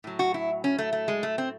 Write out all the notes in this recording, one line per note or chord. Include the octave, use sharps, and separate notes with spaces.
A2 F#3
F#4
E4
C#4
A3
A3
G#3
A3
C4